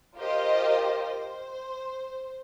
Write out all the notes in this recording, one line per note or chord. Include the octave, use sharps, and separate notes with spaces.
F4 G4 A#4 C5 D#5
C5